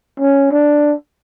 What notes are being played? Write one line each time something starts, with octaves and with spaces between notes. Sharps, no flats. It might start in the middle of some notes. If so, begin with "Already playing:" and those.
C#4
D4